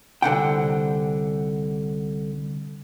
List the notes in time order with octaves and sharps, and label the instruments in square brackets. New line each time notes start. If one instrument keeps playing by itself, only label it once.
[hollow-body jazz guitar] C2 D3 F#5 G5